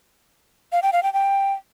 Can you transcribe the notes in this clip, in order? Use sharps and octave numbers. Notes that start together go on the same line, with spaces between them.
F5
G5
F5
G5
G5